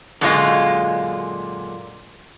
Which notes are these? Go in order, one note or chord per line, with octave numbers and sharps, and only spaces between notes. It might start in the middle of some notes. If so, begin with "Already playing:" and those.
F#2 A#2 D3 G#3 F4 D#5